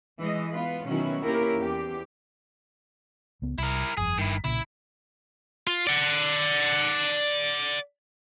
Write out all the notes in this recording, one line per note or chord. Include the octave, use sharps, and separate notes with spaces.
E3 G#3 D#5
B3 F4 B4
B2 D#3 F#3 C#4 E4 F#4
A#3 C#4 E4 G4 A#4
E2 G4
C#2 B3
C2 E4 A#4
G1 F2 G#4
G1 G2 D#3 E4
B1 A#2 C#3 E4
F4
D5 F#5